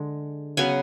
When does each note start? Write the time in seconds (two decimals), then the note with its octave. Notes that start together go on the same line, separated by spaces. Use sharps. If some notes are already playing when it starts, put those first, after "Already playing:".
Already playing: D3 G#3
0.57 C#3 F#3 B3 G#5